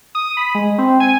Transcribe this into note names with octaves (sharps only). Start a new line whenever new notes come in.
D#6
B5
G#3
C4
G#5